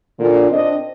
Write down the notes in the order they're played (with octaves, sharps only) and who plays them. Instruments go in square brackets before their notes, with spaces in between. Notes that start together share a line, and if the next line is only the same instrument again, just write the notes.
[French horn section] A#2 D3
C4 D4 D#5